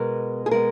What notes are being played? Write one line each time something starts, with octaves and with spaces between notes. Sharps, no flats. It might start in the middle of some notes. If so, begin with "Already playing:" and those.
Already playing: B2 G#3 B3 A#4
G#4
B2 G#3 B3 A#4